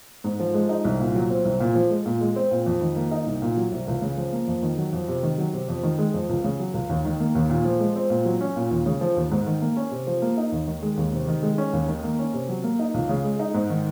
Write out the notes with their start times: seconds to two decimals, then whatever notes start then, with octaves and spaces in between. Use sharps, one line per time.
0.24 G#2
0.40 F3
0.54 G#3
0.69 D#4
0.85 C2
1.00 A#2
1.15 F#3
1.30 C4
1.45 C2
1.60 A#2
1.75 F3
1.90 G#3
2.06 A#2
2.21 G#3
2.36 C4
2.51 A#2
2.66 F2
2.81 D#3
2.96 A#3
3.11 D#4
3.26 C2
3.42 A#2
3.57 F#3
3.72 C2
3.88 C#2
4.02 C#3
4.17 F3
4.32 A#3
4.48 F2
4.63 D#3
4.78 F#3
4.93 F2
5.08 C3
5.23 D#3
5.38 F#3
5.53 C3
5.68 F2
5.83 D#3
5.98 G#3
6.14 F2
6.29 C#2
6.44 C#3
6.60 F#3
6.74 C#2
6.89 D#2
7.05 D#3
7.20 A#3
7.35 D#2
7.50 A#2
7.65 F3
7.80 G#3
7.96 C4
8.10 A#2
8.25 F#3
8.41 C#4
8.56 A#2
8.71 D#2
8.86 C#3
9.01 F3
9.16 D#2
9.31 G#2
9.46 D#3
9.61 A#3
9.77 C#4
9.91 C3
10.07 F3
10.22 A#3
10.37 D#4
10.52 D#2
10.68 D#3
10.82 G#3
10.97 D#2
11.13 C3
11.28 D#3
11.43 G#3
11.58 C#4
11.73 D#2
11.89 D#3
12.03 A#3
12.19 C#4
12.34 C3
12.49 F#3
12.64 A#3
12.79 D#4
12.94 C#2
13.09 C#3
13.24 G#3
13.39 D#4
13.54 G#2
13.70 D#3